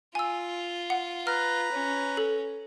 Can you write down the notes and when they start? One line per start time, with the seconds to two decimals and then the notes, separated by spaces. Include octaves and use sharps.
0.15 F4 G#5 E6
0.90 F#5
1.27 B4 A#5 F6
1.72 C#4
2.17 A4